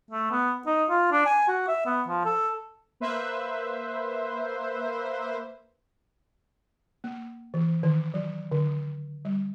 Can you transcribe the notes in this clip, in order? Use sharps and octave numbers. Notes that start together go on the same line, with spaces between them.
A3
B3
D#4
F4
D4
G#5
F#4
E5
B3
F3
A4
A#3 B4 C5 E5
A#3
E3
D#3
F#3
D3
G3